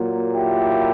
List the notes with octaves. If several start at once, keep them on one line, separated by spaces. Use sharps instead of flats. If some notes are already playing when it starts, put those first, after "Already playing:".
Already playing: A#2 F#3 A#3
E4 G4